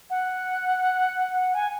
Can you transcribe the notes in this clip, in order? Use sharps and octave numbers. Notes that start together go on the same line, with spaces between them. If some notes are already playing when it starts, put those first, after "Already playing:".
F#5
G#5